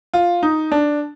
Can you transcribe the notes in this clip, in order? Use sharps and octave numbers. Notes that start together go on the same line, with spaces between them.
F4
D#4
D4